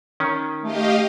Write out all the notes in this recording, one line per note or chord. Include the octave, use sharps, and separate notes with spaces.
D#3 C#4
A3 G4 D#5 F5